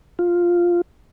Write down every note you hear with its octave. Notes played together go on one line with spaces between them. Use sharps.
F4